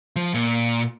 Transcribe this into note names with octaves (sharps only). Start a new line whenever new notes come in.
F3
A#2